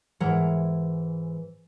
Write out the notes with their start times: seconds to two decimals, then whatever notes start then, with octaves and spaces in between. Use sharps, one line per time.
0.20 G#2 E3 A#4 F#5